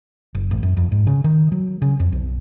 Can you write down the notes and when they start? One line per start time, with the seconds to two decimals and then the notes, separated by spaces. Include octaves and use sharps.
0.35 F#1
0.51 A1
0.63 F#2
0.77 F2
0.92 G#2
1.07 C#3
1.24 D#3
1.52 F#3
1.82 C#3
2.00 F2
2.12 B1